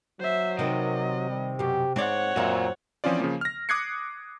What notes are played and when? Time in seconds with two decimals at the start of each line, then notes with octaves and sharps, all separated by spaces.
0.20 F#3 C5 E5
0.59 C3 D#3 C4 B4 D#5
1.30 G3
1.59 F#2 B2 G4
1.96 G#2 C4 C#5 D5 F#5
2.36 F#2 A#2 C4 F#4 E5
3.04 E3 F3 C4 C#4 F4 D5
3.19 C#3 F3 A#3
3.41 F6 A#6
3.69 D6 D#6 F#6 G#6 C7 C#7